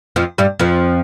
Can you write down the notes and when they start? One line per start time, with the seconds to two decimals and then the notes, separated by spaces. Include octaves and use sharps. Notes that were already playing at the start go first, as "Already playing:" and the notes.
0.16 F2 F3
0.38 G2 G3
0.59 F2 F3